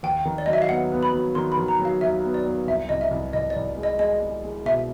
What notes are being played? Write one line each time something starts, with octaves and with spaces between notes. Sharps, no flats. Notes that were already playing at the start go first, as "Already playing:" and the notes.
D#2 G5
D#3
D5
F#3 D#5
E5
F5
B3 F#5
B3
B5
F#3
D#3 C6
B5
D#3
A#5
F#3
F5
D#2 E5
B3
D5
B3
C2 E5
C2 D#5
E5
C2
C2 D#5
D5
C2
G#3
D#5
G#3 D#5
G#3
G#3
B2 E5